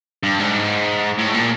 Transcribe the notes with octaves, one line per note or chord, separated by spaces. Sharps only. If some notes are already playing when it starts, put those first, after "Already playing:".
G2
G#2
A2
A#2